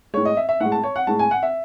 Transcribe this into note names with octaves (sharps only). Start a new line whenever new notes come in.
A2 G#3 C#5
D#5
E5
E5
A2 G#3 F#5
A5
C#5
F#5
A2 G#3 A5
G#5
F#5
E5